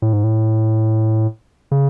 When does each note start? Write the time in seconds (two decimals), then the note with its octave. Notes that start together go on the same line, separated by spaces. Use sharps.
0.02 A2
0.13 G#2
0.24 A2
1.71 C#3